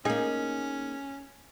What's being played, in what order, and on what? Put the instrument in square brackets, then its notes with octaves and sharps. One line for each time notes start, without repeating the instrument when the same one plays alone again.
[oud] A#3 D#4 [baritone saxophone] C#4 [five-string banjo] G#4